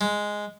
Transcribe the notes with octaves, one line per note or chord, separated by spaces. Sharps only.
G#3